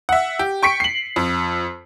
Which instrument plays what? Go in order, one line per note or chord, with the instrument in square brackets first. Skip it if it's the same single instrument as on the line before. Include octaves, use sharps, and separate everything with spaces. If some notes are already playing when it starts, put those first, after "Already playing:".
[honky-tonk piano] E5 F#5
G4
G5 C#6 B6 C#7 D7
C7 F#7
F2